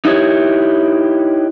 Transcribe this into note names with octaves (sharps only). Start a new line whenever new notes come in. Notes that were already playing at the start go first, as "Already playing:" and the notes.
D#4 E4 G4 C#5